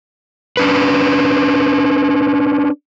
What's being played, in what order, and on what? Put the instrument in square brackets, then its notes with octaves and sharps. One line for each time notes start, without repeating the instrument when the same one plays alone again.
[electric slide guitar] C#4 D4 B4